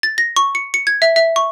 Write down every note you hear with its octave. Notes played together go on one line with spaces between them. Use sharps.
A6
A#6
C#6
C#7
C#7
G#6
E5
E5
C#6